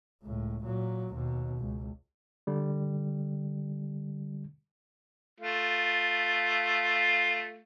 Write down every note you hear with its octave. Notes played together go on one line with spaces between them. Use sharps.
C#2 A2
A#2 F#3
D#2 B2
C#2
D3 G3
A3 F4